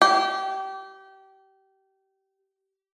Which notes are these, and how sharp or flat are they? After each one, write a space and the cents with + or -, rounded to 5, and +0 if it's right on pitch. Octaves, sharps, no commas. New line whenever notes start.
G4 -25